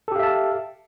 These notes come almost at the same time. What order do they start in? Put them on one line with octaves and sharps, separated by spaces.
A4 G4 F5 E5 A5